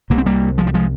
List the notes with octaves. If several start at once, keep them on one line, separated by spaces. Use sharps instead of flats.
C2 C3 A#3
C4
G3 A#3
F3 G#3
G3
F3 G#3